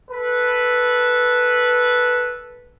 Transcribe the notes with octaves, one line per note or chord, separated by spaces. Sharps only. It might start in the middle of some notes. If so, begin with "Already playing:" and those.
A4 B4